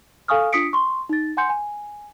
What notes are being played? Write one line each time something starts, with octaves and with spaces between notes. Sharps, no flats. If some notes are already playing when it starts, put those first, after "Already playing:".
A4 F5 G#5 C#6 D#6 F6
D4 F4 D#6 B6 C#7 D7
C6 C#6
D#4 A6
F#5 G#5 C6 G6 C#7
G#5